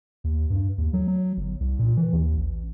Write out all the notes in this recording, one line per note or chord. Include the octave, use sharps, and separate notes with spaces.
D#2
G2
D#2
F#3
F#3
G1
C2
A#2
E3
D#2
A1